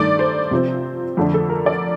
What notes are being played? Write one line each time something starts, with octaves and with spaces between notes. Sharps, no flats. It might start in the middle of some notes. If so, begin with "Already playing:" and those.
Already playing: G2 D#3 A3 D5
C5
C3 F3 C4
F2 D3 A3 D4
A4
A#4
D5